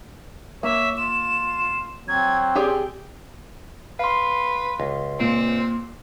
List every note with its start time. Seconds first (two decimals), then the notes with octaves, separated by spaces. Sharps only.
0.63 A#3 C#5 E5
0.97 F4 E7
2.08 F#3 C4 G#6
2.55 G4 G#4 D5 G5
3.99 B4 F5 C6
4.80 C#2
5.20 A#2 C4